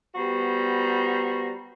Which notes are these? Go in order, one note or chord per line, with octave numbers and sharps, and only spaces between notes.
G3 B3 F#4 C5 A#5